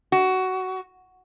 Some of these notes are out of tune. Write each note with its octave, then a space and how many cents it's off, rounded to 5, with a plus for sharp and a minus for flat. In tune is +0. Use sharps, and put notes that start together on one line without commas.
F#4 +15